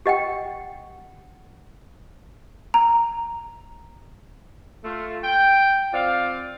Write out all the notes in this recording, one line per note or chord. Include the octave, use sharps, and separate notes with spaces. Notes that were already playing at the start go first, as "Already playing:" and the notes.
G4 D#5 F#5 G5
A#5
A3 F4
G5
C4 F4 D5 F5